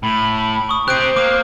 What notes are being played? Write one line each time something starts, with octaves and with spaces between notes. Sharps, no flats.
A2 B5
C#6 D#6
C4 G4 C5 F#6 G6 D7
A#3 D6